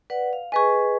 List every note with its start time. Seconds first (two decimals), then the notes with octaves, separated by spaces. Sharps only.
0.10 B4 D5 F#5
0.33 F5
0.52 G#4 B4 D#5 G#5 C#6